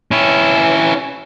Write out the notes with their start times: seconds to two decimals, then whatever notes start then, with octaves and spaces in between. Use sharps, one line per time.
0.11 C#4 E4